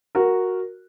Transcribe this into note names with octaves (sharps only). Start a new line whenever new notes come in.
F#4 A#4